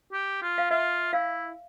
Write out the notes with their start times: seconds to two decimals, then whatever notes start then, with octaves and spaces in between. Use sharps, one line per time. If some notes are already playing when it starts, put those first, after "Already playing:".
0.13 G4
0.42 F4
0.58 F5
0.70 F4 E5
1.13 E4 F5